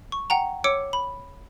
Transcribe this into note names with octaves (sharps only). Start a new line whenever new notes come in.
C#6
F#5 G5 A#5
C#5 D6 E6 C#7 D7
B5